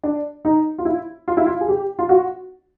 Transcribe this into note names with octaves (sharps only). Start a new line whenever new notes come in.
D4
D#4
F4
E4
F4
E4
F4
G#4
G4
F4
F#4